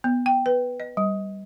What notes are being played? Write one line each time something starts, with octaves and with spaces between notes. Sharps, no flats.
B3
G5
B4
D#5
G3